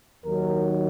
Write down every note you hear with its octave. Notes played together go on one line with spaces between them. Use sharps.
D#2 D#3 F#3 A#4